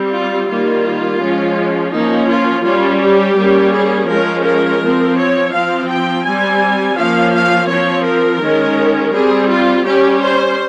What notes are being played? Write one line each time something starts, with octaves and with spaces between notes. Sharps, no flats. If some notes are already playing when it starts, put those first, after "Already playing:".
Already playing: G3 C4
F4
D#3 G3 A#3 F4
F3 G#3 C#4
F3 A#3 C#4 D#4
F4
G3 C#4 F4
G4
G3 A#3 C#4
G#4
F3 G#3 C#4 A#4
A#4
F3 C4
C#5
F3 C4 F5
G5
G3 C4 G#5
F3 A#3 C#4 F5
F5
F3 C4 C#5
A#4
D#3 G#3 C#4
G3 C4 G#4
F4
G3 C#4 G4
C5